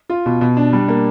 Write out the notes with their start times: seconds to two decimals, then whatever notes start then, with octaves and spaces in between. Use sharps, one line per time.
0.10 F4
0.26 B2
0.41 B2
0.57 D4
0.73 G3
0.88 A#3